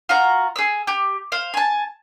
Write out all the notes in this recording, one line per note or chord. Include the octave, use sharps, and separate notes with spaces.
F4 F#4 A#5
G#4 E6
G4
C5 F5
G#5 A5